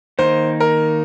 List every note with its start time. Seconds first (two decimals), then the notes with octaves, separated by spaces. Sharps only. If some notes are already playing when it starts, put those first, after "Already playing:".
0.19 D#3 A#3 D#4 C5
0.60 A#4